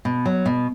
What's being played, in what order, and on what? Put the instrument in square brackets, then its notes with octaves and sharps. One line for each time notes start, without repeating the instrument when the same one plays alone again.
[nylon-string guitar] B2
F#3
B2